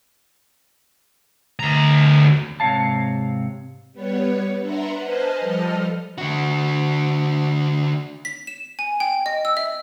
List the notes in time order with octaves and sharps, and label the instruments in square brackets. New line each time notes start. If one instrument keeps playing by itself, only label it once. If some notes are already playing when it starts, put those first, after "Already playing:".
[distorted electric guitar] D2 A#5
[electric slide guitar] G#2 C3 C#5 F5 A5
[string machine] G3 B3 B4 C#5
D4 B4 E5 F#5 A#5 C6
B4 C5 D#5 G#5 A5 F6
F3 G3 A4 D#5 A5 F6
[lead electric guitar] D3 F#4
[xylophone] B6
E7
G#5
G5
D#5
E6
E5